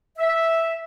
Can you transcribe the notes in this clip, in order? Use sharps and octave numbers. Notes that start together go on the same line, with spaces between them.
E5